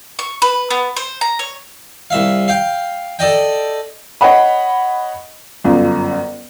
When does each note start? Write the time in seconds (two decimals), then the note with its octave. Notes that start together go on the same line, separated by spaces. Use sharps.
0.19 C#6
0.42 B4
0.70 B3
0.97 C5
1.21 A#5
1.39 C#5
2.10 C2 E5 F5
2.48 F5 G5
3.19 A4 D5 D#5 G5
4.21 C#5 D#5 F#5 B5
5.64 G1 F#2 F4